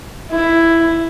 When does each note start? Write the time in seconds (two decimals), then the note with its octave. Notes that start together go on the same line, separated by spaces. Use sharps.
0.31 E4